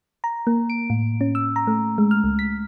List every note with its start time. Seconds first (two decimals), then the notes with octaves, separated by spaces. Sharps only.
0.24 A#5
0.47 A#3
0.70 D7
0.90 A2
1.21 C#4
1.35 E6
1.56 A#5
1.67 A3
1.98 G#3
2.11 F6
2.24 C#2
2.39 B6